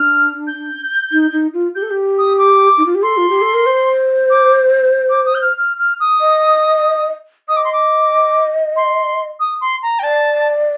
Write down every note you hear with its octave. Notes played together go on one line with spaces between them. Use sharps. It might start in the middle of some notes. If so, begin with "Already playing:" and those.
Already playing: D4 F6
G6
D#4
D#4
F4
G4 G6
A4
G4
D#6
D6
D#4
F4
G4
A4 C6
F4
G4
A4
A#4
C5
D6
D6
D#6
G6
F6
F6
F6
D#6
D#5
D#5 D#6
D6
C6
D6
C6
D#6
C6
A#5
G5
D5 A5